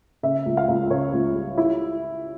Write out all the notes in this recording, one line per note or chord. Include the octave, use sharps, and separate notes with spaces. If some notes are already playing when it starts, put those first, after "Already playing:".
C#3 E5
C#2
F5
C#2
C#3 C#5
C#2
G3
E4